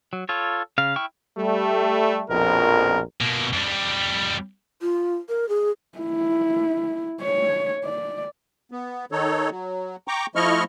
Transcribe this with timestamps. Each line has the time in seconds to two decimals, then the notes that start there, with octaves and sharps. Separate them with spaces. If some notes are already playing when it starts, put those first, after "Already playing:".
0.13 F#3
0.29 F4 A4 C#5
0.78 C#3 F5
0.96 E4 G5 C#6 F6
1.37 G3 A3
2.29 A#1 F2 B2 A#4
3.21 B2 A#3
3.53 F2 G3
4.82 F4
5.29 A#4
5.49 G#4
5.98 E4
7.21 C#5
7.84 D5
8.72 B3
9.12 D#3 D#4 A4 C#5
9.50 F#3
10.08 G5 A#5 C#6 D6
10.35 F3 A3 E4 D#5 C#6 F6